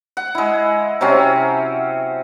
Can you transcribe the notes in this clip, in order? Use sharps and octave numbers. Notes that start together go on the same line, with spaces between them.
F#5
G#3 E4
C3 F#3 C4 C#4